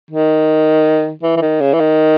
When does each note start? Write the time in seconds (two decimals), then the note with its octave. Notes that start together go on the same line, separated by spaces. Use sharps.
0.11 D#3
1.23 E3
1.36 E3
1.42 D#3
1.61 C#3
1.73 E3
1.80 D#3